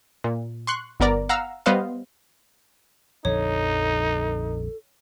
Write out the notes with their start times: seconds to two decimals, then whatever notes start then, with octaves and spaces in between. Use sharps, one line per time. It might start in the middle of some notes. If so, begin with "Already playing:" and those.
0.24 A#2
0.67 C6 C#6 F#6
1.00 G1 B3 A#4 D5 A#5
1.29 F5 F#5 A#5 E6 F6
1.66 G3 B3 B4 C5 D#5 F5
3.25 A#1 F2 D3 D#4 A4 C#5